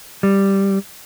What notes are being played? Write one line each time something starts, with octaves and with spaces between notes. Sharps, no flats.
G3